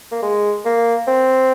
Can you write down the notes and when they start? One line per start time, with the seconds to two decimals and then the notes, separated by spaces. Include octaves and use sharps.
0.12 A#3
0.22 G#3
0.65 A#3
1.07 C4